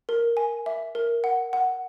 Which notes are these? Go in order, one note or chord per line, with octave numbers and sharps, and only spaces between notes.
A#4
G#5
E5
A#4
F#5
F#5